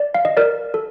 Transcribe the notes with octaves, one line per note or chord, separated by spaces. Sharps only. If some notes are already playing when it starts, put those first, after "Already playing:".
Already playing: D5
F5
D#5
A#4 D5
A4